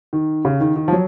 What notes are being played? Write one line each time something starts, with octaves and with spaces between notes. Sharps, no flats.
D#3
C#3
D#3
D#3
F3
F#3